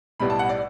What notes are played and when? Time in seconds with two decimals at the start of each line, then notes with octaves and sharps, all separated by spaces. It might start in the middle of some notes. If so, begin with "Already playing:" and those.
0.20 B1 A2 G3 B3 B5
0.30 A5
0.39 F#5
0.49 D5